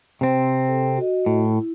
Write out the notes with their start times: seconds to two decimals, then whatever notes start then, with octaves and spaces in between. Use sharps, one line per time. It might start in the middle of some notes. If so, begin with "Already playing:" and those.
0.21 C3 C4 C5
0.68 A4
0.97 F#4 D#5
1.26 A2
1.45 E4